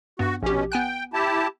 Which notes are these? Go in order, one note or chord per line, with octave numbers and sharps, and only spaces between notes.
G2 B3 F#4
A#1 B2 C#4 G4
B3 G5 G#5 F#6
E4 G4 A5